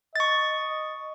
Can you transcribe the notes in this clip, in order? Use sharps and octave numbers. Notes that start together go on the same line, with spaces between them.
D#5 C#6 A6